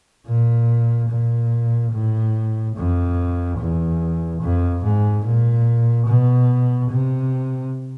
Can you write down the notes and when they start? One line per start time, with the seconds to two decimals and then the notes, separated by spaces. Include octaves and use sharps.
0.26 A#2
1.09 A#2
1.93 A2
2.76 F2
3.58 E2
4.41 F2
4.83 G#2
5.25 A#2
6.07 B2
6.90 C3